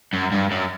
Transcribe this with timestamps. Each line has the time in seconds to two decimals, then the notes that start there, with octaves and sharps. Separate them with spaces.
0.13 F#2
0.32 G2
0.51 F#2